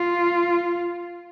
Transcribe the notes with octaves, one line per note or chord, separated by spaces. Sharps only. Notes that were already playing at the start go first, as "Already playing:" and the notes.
Already playing: F4